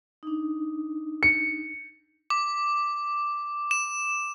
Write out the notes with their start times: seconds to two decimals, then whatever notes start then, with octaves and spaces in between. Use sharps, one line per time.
0.23 D4 D#4
1.23 C#7
2.30 D6
3.71 E7